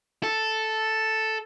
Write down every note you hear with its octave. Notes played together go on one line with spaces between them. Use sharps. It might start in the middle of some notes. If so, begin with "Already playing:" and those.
A4